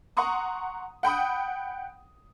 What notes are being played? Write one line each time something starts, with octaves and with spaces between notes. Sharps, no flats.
F#5 A#5 C6 C#6 D#6
F#5 G5 B5 D#6